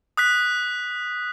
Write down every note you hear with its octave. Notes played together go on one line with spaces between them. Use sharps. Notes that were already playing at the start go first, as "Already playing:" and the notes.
D#6 F#6 B6